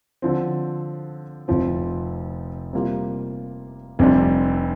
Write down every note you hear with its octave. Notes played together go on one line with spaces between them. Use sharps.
D3 F3 C4
F1 F2 F3 C4
C3 G3 A#3 F4
F1 F2 C3 G3 D4